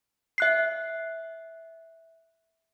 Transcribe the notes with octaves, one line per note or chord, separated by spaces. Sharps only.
E5 F#6 C7